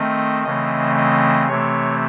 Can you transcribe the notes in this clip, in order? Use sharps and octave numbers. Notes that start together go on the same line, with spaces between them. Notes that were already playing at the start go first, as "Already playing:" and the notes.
Already playing: D#3 A3 C4 D#5
C#3 E3 A3 C4 D#5
D#5
C3 E3 A3 C4 C#5